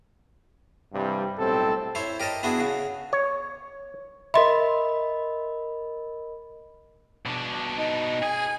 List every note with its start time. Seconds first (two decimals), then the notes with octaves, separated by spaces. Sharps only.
0.93 G2 C3 E3 G3
1.38 B1 A2 G3 C4 A4
1.95 E4 C5 C#5
2.20 G4 A#4 D#5 A5
2.43 B3 D4 E4 F#4 G#4
2.58 C#3 F#4
3.13 C#5
4.34 A#4 D#5 E5 B5 C6
7.26 B2 D4
7.78 D#4
8.23 G#4 G#5